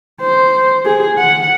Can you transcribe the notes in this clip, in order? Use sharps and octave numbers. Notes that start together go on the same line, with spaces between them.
C5
G#4
F#5